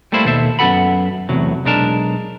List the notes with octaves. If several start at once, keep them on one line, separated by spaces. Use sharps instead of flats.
G3 A3 A#3 E4 C5
D#2 B2 A4 C5 E5
F#2 B3 G#4 A4 F#5 B5
E2 A2 C3 F#3
B1 G#3 D4 A#4 A5